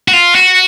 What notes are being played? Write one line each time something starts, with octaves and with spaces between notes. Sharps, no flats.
F#4
F4
F#4